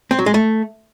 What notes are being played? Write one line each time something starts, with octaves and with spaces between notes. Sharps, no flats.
C4
F#3
G#3
A3